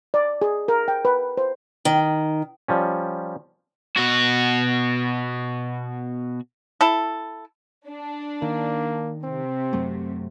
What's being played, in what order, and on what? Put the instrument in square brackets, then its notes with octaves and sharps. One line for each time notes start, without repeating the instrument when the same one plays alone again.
[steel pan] D5
G#4
A#4
G5
B4
C5
[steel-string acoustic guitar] D#3
[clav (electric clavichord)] F3 G3 C#4
[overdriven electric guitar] B2 F#4
[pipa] E4 A4
[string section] D4
[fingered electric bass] D#3 [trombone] A#3
[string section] C3 [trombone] C4
[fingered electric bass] F#2 F#3 A3